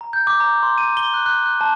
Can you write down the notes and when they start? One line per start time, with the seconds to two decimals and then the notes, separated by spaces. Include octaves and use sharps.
0.01 A#5
0.13 G6
0.27 D6
0.40 A#5
0.63 C6
0.78 D#7
0.97 G7
1.14 F#6
1.26 F#6
1.46 F#6
1.61 A5